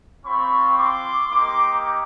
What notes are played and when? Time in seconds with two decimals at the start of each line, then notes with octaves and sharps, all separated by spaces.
0.25 C4 F4 B5 C#6
0.77 C6 D6
1.30 A#3 D#4 G4 C6 D6